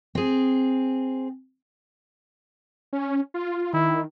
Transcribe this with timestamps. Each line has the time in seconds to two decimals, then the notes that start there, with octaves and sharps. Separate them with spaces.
0.15 C4 G#4
2.93 C#4
3.34 F4
3.73 D#3 E4